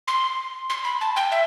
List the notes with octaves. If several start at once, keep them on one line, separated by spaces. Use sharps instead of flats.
C6
C6
B5
A5
G5
E5